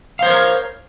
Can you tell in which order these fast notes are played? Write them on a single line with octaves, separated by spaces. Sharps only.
F5 C5 C#5 A#4